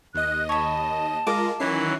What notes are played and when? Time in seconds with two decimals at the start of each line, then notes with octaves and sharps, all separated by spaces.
0.15 D#2 D#5 F#6
0.49 C#5 A5 B5
1.27 G#3 F4 A#4 D#5 D6
1.60 D#3 E3 F#3 C#4 E4 C7